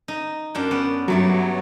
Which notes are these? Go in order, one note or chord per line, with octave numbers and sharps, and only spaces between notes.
D#4
F#2 D4 G5
B3 C#4 D5
G2 F#3 A3 D5